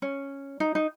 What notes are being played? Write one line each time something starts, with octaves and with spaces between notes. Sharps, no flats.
C#4
D#4
D#4